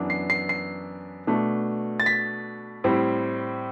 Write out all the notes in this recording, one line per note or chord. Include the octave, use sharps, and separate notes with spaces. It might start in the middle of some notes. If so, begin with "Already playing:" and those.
Already playing: F#2 E3 B3 D4
C7
C7
C7
B2 A3 D4
A6
B6
A2 G3 C4 E4